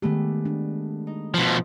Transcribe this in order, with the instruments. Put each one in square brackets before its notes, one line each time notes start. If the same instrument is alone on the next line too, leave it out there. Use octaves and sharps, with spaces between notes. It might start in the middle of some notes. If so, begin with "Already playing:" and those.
[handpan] D#3 G4 [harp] G#3 A3 B3
[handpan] D4
[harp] D#4
[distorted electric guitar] B2 F3